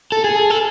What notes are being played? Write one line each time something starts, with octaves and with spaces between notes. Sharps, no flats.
A4
G#4
A4